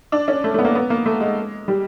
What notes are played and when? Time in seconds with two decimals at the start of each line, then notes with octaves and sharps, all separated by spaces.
0.12 D4
0.28 C#4
0.44 A3
0.54 A3
0.59 B3
0.65 A#3
0.75 B3
0.90 A#3
1.06 A3
1.21 G#3
1.68 G3